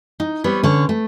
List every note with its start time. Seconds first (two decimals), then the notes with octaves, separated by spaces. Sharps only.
0.20 D#4
0.44 G3 B3 C5 C#5
0.63 D3 C#4 C#5
0.89 A3